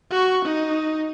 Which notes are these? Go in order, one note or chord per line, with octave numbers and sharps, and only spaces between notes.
F#4 C#6
D#4